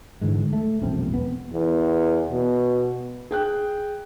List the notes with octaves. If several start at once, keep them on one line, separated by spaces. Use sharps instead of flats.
G#2 D3 E3 G#3
A3
E1 A#1 F#2 C4
B3
E2
B2
G#4 G5 F#6